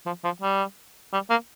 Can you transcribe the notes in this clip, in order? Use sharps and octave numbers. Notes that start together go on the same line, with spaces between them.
F3
F3
G3
G3
A#3